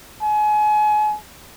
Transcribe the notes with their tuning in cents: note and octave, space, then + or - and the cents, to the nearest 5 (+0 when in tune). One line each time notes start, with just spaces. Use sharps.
G#5 +30